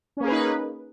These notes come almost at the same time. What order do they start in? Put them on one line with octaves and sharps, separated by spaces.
C#4 A#3 G#4 B4 D#4